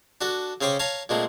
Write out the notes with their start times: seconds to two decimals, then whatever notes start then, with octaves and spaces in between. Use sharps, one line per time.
0.21 D4 F#4 A4
0.61 C#3 C#4 C5 G5 C#6 D6
0.79 C#5 F5 A5 A#5
1.09 A#2 G#3 A3 C4